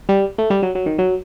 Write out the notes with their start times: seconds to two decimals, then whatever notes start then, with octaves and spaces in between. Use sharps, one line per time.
0.09 G3
0.38 A3
0.50 G3
0.63 F#3
0.75 F#3
0.86 D#3
0.99 F#3